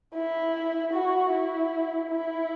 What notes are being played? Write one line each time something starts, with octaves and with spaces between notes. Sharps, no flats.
E4
F#4
E4
E4